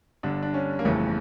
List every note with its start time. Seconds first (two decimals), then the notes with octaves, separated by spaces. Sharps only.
0.23 G1 G2 D3 D4
0.43 D4
0.54 C#4
0.79 A#3
0.85 G1 F2 C#3 E3 A3